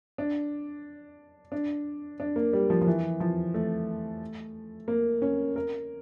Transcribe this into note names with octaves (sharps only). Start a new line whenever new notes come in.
D4
D4
D4
A#3
G3
F3
F3
E3
F3
A3
A#3
C#4
A#4